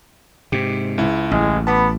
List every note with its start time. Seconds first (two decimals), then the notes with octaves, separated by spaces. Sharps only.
0.52 G#2 C3 G4
0.98 C#2 E4
1.31 A1 G#3
1.67 B3 A5 B5 D6